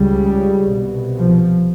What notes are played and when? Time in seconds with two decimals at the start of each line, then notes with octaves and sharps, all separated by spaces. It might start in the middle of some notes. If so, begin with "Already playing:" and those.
Already playing: C#2 C#3 G3
0.72 C2 B2
1.17 F3